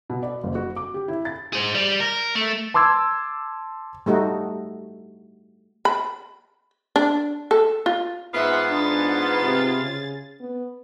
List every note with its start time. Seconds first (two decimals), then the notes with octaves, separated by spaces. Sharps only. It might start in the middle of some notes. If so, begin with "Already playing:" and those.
0.10 B2
0.23 D5
0.43 F#1
0.55 F#4
0.76 D6
0.94 G4
1.08 E4
1.25 A6
1.53 G#4 C5
1.75 G3
2.00 A#4
2.35 A3
2.74 A5 C6 D6 E6 G#6
4.06 G3 A3 D#4 F#4
5.85 B5
6.96 D4
7.51 A4
7.86 F4
8.34 G#2 B3 F4 E5 F#5
8.70 D4 G#4 A6
9.43 C3
9.83 C#3
10.41 B3